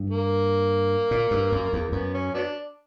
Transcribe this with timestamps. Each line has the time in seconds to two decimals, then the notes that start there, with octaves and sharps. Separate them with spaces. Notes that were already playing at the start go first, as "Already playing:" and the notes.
Already playing: G2
0.10 A#3
1.11 A#2
1.31 G2
1.52 F#2
1.73 E2
1.92 F#2 B3
2.14 C#4
2.34 F#3 B3 D4